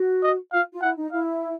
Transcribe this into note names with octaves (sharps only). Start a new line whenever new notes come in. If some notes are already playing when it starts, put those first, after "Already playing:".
Already playing: F#4
D#5
F4 F5
F4
E4 F#5
D#4
E4 F5